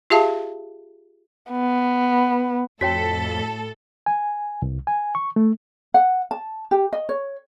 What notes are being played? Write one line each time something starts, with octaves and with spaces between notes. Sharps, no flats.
F4 G4 G#4 E5 F5 A5
B3
F2 A2 F#4 A4 C#5 G5 B6
G#5
C2
G#5
C#6
A3
F#5
A5
G4
D#5
C#5